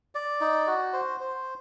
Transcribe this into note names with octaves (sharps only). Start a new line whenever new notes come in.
D5
D#4
F#4
C5
C5